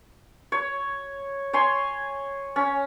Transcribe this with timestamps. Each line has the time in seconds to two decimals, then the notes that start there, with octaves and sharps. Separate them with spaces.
0.52 C#5
1.53 C#5 G#5 C6
2.56 C#4